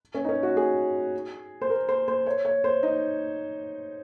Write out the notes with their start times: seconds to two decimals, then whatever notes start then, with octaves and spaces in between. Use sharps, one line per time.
0.14 C#4
0.25 D#4
0.29 C#4
0.43 F#4
0.57 G#4
1.61 C5
1.70 A#4
1.89 C5
2.08 C5
2.27 C#5
2.45 C#5
2.64 C5
2.83 D#4